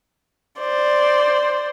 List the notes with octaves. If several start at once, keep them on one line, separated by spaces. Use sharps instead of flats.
C5 D5